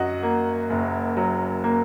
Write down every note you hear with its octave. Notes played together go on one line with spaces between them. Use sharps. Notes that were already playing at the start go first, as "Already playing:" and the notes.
Already playing: F#2 F#4 D#5 F#5
A#3
F#1
F#3
A#3